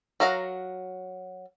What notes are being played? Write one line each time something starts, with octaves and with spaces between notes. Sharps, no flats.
F#3 A#4 F5 F#5 A#5